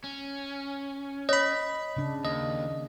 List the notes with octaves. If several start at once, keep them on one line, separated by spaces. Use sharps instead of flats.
C#4
C#5 D#5 B5
C#3 D4
D#2 D#5